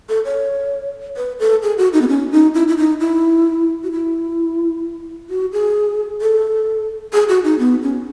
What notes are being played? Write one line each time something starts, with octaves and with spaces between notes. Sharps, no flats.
A4
C#5
B4
A4
G#4
F#4
D#4
B3
C#4
D#4
E4
E4
D#4
E4
F#4
E4
F#4
G#4
A4
G#4
F#4
D#4
B3
C#4